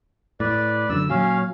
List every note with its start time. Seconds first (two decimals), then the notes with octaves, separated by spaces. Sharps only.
0.40 A2 B4 D5
0.90 F#2 D3 E6
1.10 A#2 F#3 C#4 F5